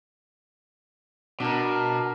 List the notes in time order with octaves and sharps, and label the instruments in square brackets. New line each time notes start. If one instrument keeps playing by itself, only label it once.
[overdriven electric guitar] B2 [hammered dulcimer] D4 A#4